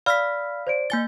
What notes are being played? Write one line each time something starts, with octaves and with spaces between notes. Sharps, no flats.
D5 F5 B5 E6 F6 B6
C5 D5 D7
A#3 G#5 A6 G7